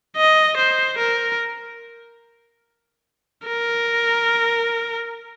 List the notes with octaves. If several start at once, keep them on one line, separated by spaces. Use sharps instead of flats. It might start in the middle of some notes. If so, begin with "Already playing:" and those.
D#5
C5
A#4
A#4